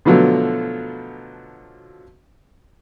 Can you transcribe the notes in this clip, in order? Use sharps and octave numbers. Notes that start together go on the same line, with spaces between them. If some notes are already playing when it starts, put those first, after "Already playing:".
B2 D3 F3 F#3 A3 B3